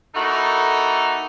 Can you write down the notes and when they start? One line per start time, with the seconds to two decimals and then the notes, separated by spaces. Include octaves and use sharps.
0.15 A#3 D#4 E4 F#4 A4 A#4